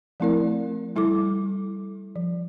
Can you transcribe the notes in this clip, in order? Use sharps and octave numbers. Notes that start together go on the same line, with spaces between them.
F3 A3 C4 E4 A#4 D5
G3 E4 A4 D6
F3